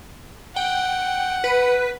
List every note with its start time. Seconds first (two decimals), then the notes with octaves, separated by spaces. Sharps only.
0.56 F#5 G5
1.44 B4